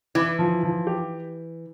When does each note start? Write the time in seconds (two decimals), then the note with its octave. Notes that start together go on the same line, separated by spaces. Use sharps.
0.15 E3 E4
0.39 F3
0.63 F3
0.87 G4